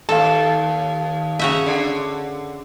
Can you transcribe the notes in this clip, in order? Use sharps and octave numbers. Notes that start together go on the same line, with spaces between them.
D#2 A4 F5 A5
C#3 F#4 E5
D3